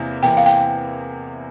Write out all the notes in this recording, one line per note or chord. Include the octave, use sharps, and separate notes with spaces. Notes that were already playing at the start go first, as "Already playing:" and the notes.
Already playing: E2 C3 E3 A#3 E4
E2 C3 E3 A#3 E4 G5
F5
G5